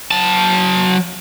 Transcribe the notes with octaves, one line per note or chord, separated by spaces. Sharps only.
F#3 A5